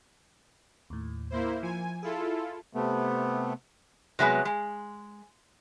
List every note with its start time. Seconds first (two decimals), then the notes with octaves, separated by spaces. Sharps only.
0.90 D#2 A2
1.30 A#3 E4 C5
1.63 F3 G#5
2.03 E4 F4 G#4 A4
2.73 C3 A3 B3
4.19 C3 F#3 G#3 B3
4.45 G#3